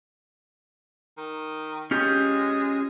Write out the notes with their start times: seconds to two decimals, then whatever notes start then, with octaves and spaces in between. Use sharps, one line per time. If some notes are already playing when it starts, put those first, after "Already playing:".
1.18 D#3
1.91 G#3 C#4 F4 G4